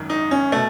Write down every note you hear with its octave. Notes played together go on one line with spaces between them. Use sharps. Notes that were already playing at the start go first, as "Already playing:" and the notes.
Already playing: G#1 F#2 D#3
D#4
C#4
B2 A3